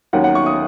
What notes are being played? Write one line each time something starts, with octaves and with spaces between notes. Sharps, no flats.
D#2 D#3 F#3 C#4 F#5
F#5
C#6
D#6